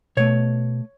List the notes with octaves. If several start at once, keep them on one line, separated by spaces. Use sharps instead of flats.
B2 A3 C#5